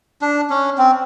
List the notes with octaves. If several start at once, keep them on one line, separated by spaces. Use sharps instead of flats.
D4
C#4
C4